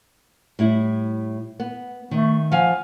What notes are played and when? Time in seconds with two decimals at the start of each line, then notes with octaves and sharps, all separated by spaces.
0.59 A2 G3 E4
1.60 B3
2.11 D#3 A3
2.52 F3 F5 F#5 G#5